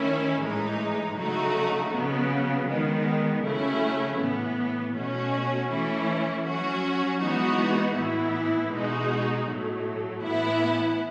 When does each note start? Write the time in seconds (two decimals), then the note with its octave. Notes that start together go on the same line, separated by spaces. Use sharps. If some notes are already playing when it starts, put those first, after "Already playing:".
Already playing: D#3 A3 C#4 E4
0.42 A2 E3 G#3 D#4
1.17 C#3 F#3 A3 D#4 F#4
1.93 C#3 F#3 B3
2.68 D#3 G#3 B3
3.44 C#3 F#3 A3 C#4 E4
4.19 A2 E3 B3
4.95 B2 A3 C#4 F#4
5.70 E3 A3 C#4 E4
6.45 F#3 C#4 F#4
7.21 E3 G#3 B3 D#4 F#4
7.96 A2 E3 B3 E4
8.72 B2 G#3 D#4 F#4
9.48 A2 F#3 A3
10.23 A2 E3 B3 E4